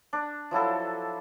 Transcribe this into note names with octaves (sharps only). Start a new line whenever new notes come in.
D4
F3 F#3 E4 A4